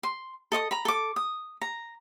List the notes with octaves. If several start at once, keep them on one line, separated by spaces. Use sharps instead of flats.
C6
A4 D#5 C#6 D#6
A#5 B5
A4 D6
D#6
A#5